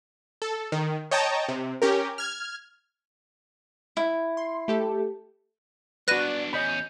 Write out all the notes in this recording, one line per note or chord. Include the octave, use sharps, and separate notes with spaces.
A4
D#3
C#5 D#5 G5 A5 A#5
C3
C#4 G4 A#4
F6 G#6
E4
C6
A3 G4 A4
B3 D4 F#4 B4 D5 F#6 A#6 D#7
E2 C#4 D#5 B5 G6